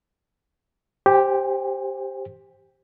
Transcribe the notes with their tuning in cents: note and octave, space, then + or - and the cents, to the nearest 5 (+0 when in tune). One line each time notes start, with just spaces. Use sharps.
G4 +0 C5 +10 G#5 -35